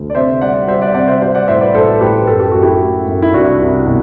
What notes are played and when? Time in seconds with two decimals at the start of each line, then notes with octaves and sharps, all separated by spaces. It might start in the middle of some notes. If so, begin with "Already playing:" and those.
Already playing: D2
0.10 D5
0.15 C3 C5 E5
0.41 G3 D5 F#5
0.68 G3 C5 E5
0.81 D5 F#5
0.94 C3 D5 F#5
1.08 C5 E5
1.21 G3 C5 E5
1.35 D5 F#5
1.48 A2 C5 E5
1.61 B4 D5
1.74 A1 A4 C5
2.01 A2 G4 B4
2.27 F#2 A4
2.40 G4
2.51 F#2 F#4
2.62 E4 G4
2.80 A3
3.08 F#2
3.22 E4
3.34 C2 D4 F#4
3.60 C2
3.87 B2